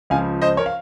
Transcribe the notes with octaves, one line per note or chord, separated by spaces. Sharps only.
C#2 C#3 F3 F5 G#5
C5 D#5
A#4 C#5
F5